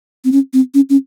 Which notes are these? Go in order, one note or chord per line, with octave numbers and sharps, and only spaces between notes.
C4
C#4
C4
C#4
C#4